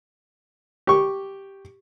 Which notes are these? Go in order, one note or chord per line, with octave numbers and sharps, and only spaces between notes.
G4 C#6